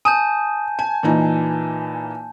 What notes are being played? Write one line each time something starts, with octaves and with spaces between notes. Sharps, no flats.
G#5 A5 D#6 G6
G#5 A5
A#2 E3 D#4